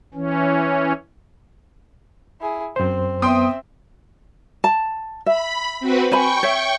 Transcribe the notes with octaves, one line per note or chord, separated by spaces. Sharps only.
E3 C#4
E4 G#4
F#2 C4 C5
B3 C4 E5 G5 C6 D#6
A5
E5 B5
C4 F#4 B4
C5 G5 G#5 B5 C#6
C#5 E5